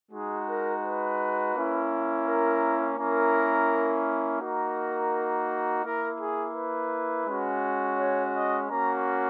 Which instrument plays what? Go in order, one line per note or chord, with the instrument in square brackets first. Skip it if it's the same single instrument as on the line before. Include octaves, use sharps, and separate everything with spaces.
[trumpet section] G#3 D#4 F#4 G#4
A#4
B4
A#3 C#4 E4
A#4
A#3 C#4 E4 A#4
A#3 D#4 F#4 A#4
A#3 E4 A#4
G#4
B4
G#3 C#4 F#4
C#5
D#5
A#3 C#4 F#4 A#5